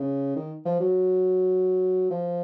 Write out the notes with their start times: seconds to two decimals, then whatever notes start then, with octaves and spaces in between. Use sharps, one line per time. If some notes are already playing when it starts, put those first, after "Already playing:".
Already playing: C#3
0.36 D#3
0.65 F3
0.80 F#3
2.11 F3